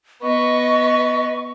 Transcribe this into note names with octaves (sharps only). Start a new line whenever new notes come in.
B3 D#5 C#6